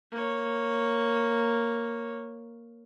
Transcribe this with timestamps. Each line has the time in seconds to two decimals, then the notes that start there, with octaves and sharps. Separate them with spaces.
0.11 A#3 C#5